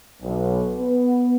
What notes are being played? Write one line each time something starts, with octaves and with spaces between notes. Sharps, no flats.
B1
B3